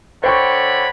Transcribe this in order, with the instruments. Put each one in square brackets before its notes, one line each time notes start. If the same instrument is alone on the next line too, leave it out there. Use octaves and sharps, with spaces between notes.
[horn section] D3 C#5 B5 [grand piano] C5 G5 C#6